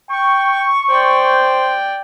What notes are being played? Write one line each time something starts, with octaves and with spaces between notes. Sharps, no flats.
G5 C#6
C5 D5 G5